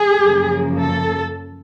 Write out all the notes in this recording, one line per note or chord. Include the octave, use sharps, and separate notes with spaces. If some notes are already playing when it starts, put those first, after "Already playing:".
Already playing: G#4
F#2 C#3 F3 A#3
A4